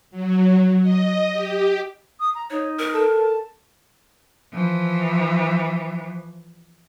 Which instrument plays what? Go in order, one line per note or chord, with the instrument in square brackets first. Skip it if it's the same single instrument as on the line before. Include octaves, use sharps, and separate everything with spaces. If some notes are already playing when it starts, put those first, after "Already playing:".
[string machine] F#3
D#5
G4
[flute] D#6
A#5
[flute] D#4 [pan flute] C#5
[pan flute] A#4
[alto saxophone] A4
[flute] A5
[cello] E3 F3